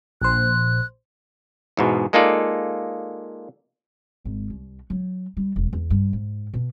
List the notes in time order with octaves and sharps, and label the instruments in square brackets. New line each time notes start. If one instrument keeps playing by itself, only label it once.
[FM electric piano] A#1 C5 [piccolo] F#6
[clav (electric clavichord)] E2 G#2 B2
G#3 A#3 D#4 F4 A4 D5
[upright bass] G#1
C2
F#3
G3
E1
E2
G2
G#2
B2